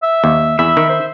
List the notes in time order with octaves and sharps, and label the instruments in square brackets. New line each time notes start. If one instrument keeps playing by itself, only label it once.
[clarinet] E5
[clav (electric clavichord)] D#2
[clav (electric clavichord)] E2 [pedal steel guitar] E5 [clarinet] B5
[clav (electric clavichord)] D#3
[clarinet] C5